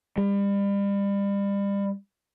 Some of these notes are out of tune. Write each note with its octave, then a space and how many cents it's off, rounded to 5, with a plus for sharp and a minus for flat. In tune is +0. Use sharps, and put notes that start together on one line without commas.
G3 +35